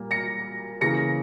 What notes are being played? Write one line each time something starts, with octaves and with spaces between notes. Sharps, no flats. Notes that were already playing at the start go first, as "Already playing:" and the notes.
Already playing: A#2 G3 A#3
A#6 C#7
C#3 E3 A#3 A#6 C#7